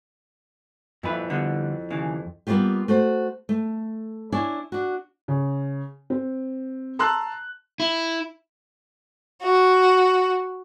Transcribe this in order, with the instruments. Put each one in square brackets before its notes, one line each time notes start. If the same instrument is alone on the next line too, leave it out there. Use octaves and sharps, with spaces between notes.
[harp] F2 E4 [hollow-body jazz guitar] A#2 B4
[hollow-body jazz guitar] D3 G3 B3
D#2 C#3 E3
[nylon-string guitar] G3 A#3 B3 D4 F4 G4
A3 F#4 C5
A3
D4 E4 C#5 G#5
D4 F#4
[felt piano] C#3
C4
A5 A#5 C6 E6 F#6
[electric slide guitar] E4
[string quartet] F#4